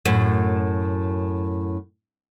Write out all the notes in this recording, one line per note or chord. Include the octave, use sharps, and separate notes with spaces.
F#2 A2